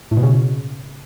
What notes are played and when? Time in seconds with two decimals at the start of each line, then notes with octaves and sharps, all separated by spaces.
0.11 A2
0.17 B2
0.23 C#3